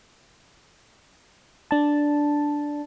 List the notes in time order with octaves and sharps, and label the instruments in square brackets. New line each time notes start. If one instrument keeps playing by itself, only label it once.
[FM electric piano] D4 A5